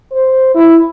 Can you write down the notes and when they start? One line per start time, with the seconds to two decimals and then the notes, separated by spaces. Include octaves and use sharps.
0.12 C5
0.55 E4